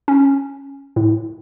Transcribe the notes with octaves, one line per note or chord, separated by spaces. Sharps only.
C#4
A2